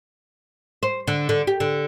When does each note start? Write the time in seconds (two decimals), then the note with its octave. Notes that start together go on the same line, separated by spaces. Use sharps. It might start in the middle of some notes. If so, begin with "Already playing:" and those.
0.83 C5
1.08 D3
1.29 D3
1.47 G4
1.60 D3